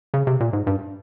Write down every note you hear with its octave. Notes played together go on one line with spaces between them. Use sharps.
C#3
C3
A#2
G#2
G2